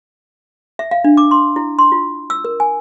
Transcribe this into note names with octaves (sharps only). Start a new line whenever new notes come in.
E5
F5
D4
D6
C6
E4
C6
F4
E6
A#4
G#5